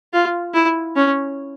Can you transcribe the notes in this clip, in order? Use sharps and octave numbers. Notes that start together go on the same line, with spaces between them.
F4
E4
C#4